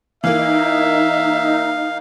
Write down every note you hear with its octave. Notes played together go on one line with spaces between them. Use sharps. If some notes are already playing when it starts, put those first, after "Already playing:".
E3 A#3 D#4 E5 F5